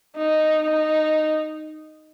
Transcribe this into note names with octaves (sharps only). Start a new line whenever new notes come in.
D#4
D#4